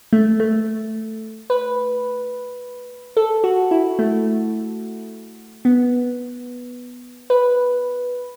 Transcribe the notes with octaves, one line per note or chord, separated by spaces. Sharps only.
A3
A3
B4
A4
F#4
E4
A3
B3
B4